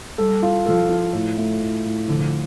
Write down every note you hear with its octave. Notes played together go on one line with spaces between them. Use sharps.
G3 A4
F4
F3 A4
F4
A2
A3
A2
A2
D3 F3